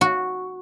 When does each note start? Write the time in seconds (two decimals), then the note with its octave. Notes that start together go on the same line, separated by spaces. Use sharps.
0.01 F#4